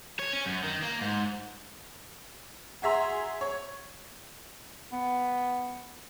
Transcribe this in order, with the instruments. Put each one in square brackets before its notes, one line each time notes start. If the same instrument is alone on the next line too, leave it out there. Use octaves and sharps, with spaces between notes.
[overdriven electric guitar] C#5
C#4
F#2
D#3
A#3
G#2
[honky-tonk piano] F#4 G#4 E5 A#5 C6
C#5
[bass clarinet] B3